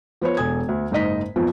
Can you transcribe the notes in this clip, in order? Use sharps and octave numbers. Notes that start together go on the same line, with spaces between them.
F3 B3 C5 C#5
E1 A4 G#5 D#6 G#6
D2
F#1 G#2 D#4 D#5 B6
B1 F2 B2 F3